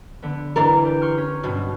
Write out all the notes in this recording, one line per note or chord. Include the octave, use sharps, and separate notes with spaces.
D3 B3
E3 D4 A#4
G4
C6 C#6 F6
C#4
G2 B2 D4